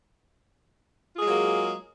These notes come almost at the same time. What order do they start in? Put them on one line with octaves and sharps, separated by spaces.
F4 G#4 G#3 F#3 A#3